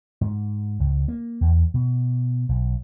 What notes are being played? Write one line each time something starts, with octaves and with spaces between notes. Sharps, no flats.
G#2
C#2
A#3
E2
B2
B1